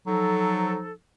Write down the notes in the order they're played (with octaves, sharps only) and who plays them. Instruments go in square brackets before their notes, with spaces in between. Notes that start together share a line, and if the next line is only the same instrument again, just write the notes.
[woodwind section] F3 D#4 A4 [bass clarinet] F#3